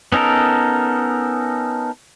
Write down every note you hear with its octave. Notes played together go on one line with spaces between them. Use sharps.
B3 C#4 D#4 A4 A#4